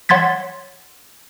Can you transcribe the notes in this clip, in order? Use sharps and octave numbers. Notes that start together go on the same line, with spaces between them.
C#5 F#5 C6 G#6 A6 B6